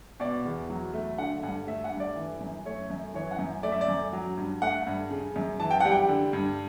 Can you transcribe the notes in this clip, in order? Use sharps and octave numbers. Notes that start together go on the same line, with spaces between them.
B2 D5
E2
F#3
A3
D3 F#5
G2 F#5
A3 E5
F#5
G2
D5
E3
F#2
A3 C#5
F#2
E3 C#5
F#5
F#2
A3 D5
E5
D5
F#2
F#3
G2
A3 F#5
G2
C#3
F#2
E3 A5
G5
G3 F#5
G5
D3
G2